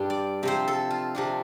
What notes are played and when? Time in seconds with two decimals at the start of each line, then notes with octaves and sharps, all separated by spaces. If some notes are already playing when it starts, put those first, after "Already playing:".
Already playing: G2 G3 D4 G5
0.10 D5
0.43 C3 F3 C4 C5
0.68 A4
0.90 F4
1.15 C3 F3 D4